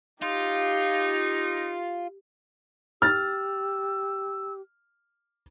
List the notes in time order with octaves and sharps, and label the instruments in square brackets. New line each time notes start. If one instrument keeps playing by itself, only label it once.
[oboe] D#4 [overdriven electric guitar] F4 [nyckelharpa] G4
[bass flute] G4 [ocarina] E6 [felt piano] F6 A6